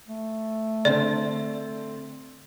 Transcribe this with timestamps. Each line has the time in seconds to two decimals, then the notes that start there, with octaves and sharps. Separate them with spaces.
0.08 A3
0.85 D3 C4 D5